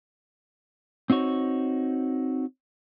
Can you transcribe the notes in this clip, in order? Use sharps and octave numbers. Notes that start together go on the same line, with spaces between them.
C4 D#4 F#4 C#5